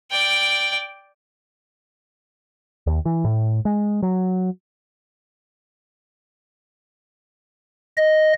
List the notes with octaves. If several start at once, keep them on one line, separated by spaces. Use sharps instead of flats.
D5 G5
D#2
E3
A2
G#3
F#3
D#5